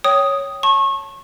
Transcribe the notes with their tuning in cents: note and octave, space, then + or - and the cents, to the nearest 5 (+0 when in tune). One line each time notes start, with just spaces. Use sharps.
C#5 +0 G5 -10 D#6 +0
A5 +0 C#6 -30